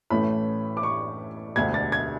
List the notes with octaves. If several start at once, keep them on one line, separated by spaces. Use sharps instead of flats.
A1 A2 E3 A3 C#4 B5
D6
C#6
E1 D2 D3 G#6
A6
G#6